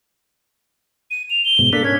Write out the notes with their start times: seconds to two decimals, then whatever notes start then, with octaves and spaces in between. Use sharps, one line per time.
1.11 D#7
1.30 F7
1.45 G7
1.59 G#2 B2
1.73 A#3 D4 A4 B6
1.85 C#4 G#6